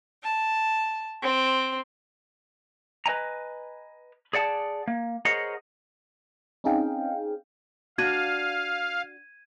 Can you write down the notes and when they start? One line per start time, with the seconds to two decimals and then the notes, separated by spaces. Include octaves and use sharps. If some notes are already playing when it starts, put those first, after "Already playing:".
0.23 A5
1.21 C4
3.06 B4 D#5 G#5 A#5
4.33 G#4 D5 F#5 A5
4.88 A#3
5.25 G#4 A#4 C5 C#5 D#5 F#5
6.64 C4 C#4 D#4 G#4 F5 G5
7.98 D4 F#4 D5 F5 G#6 D#7